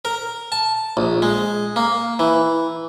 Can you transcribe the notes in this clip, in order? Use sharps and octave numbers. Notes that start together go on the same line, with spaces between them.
A#4
A5
A#1
G#3
A#3
E3